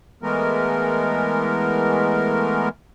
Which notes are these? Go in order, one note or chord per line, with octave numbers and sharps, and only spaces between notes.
E3 G#3 A3 B3 A#4